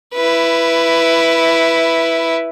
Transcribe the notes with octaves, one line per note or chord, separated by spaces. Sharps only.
E4 B4